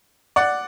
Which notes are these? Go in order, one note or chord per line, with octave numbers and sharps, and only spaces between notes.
D5 F#5